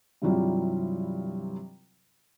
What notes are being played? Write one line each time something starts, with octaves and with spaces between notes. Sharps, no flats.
G2 C3 E3 F#3 G3 F4